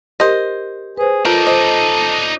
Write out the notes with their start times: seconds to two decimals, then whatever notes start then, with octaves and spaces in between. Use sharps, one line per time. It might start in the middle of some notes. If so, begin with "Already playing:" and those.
0.20 G4 A#4 C5 D#5
0.97 G#4 B4 C5
1.25 D#4 F4 A4 A#4 D5
1.47 C5 D#5